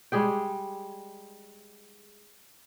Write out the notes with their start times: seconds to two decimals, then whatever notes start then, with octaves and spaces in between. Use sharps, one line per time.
0.12 G3 G#3 G#4 G5